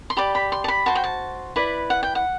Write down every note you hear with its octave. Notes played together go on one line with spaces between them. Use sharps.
C6
G4 D5 B5
B5
C6
A5
B5
F#4 C5 A5
G5
A5
E4 B4 D5
F#5
G5
F#5